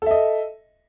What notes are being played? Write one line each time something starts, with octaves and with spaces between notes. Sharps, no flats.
A4 D#5 E5